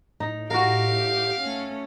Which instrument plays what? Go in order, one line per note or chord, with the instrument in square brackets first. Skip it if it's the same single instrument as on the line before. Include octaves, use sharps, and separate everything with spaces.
[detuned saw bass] A2 [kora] D#4
[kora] F#4 A#4 [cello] G4 [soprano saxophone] F5
[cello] A3 C#4